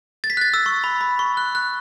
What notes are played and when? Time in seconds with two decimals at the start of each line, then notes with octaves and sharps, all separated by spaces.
0.24 A6
0.30 B6
0.37 F#6
0.41 A6
0.54 E6
0.66 C#6
0.84 B5
1.01 B5
1.19 C#6
1.37 F#6
1.55 F#6